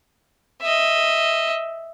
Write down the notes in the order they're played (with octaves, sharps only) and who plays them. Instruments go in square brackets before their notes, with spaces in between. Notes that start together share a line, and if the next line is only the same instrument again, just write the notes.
[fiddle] D#5 E5